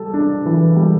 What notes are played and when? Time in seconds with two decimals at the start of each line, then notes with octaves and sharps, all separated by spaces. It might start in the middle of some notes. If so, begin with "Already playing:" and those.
Already playing: G3 A4
0.14 D4
0.46 E3
0.76 G3